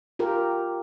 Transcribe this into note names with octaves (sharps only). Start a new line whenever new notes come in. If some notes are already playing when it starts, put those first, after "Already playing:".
F4 G4 A#4